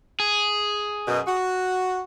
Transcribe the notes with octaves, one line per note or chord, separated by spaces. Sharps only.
G#4
F#2 B2
F#4